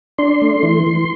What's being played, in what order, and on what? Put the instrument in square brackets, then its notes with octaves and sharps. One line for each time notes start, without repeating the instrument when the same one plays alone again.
[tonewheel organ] D4 C6
A3
E3
E3